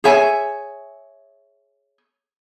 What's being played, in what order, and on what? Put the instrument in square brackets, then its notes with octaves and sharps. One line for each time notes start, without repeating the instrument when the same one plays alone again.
[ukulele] G#4 C#5 E5 G#5